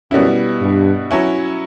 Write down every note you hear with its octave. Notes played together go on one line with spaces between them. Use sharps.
F#2 B2 G3 B3 E4
G2
F#3 C#4 E4